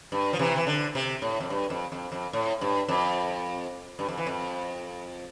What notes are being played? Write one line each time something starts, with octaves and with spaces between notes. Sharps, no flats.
G2
F3
C3 E3
E3
D3
C3
A2
F2
G2
F2
F2
F2
A2
G2
F2
G2
F2
E3
F2